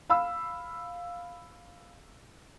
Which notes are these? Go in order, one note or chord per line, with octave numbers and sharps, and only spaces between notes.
F5 B5 E6